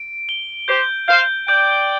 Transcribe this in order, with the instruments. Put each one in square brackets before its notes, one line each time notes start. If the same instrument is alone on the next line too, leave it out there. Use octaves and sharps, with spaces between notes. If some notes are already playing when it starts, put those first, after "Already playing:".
Already playing: [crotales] D7
G7
[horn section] G4 C5 [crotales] G6
[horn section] C5 F5 [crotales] G6
[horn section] D5 G5 [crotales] G6